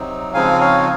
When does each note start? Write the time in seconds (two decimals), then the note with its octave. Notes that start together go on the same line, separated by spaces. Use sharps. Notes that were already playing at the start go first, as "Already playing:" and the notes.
Already playing: C3 F#3 C4 D#4
0.34 C#3 F3 G#3 C4 D#4 F5 G#5
0.61 C#5 F5